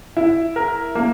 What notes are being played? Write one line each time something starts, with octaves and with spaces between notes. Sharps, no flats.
E4
A#4
A#3